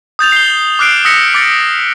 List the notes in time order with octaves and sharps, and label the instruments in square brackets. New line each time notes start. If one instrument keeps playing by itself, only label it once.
[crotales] D#6 G6 A6 F7
C7 G7
D6 F6 F#6 C7 D7
D#6 E6 A#6 B6 C#7
D6 A6 C#7